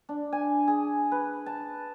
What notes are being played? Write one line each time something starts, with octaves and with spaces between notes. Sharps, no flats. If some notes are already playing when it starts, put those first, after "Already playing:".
D4
G#5
G#4
B4
A5